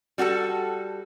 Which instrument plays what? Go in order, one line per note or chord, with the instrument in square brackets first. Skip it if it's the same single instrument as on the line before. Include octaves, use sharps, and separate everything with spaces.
[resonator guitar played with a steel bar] G3 F#4 G#4 A4